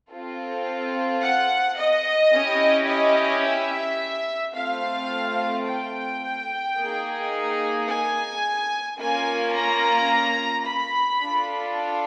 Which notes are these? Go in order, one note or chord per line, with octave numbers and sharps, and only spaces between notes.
C4 F4 A4
F#5
D#5
C#4 E4 G4
D#5
E5
A3 C4 F4 F5
G5
A#3 D#4 G#4
G#5
A#3 C#4 F4 G#5
A#5
B5
D4 F4 A4